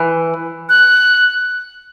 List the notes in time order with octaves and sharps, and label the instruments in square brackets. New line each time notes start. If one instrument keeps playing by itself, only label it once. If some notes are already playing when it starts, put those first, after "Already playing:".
Already playing: [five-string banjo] E3
[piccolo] F#6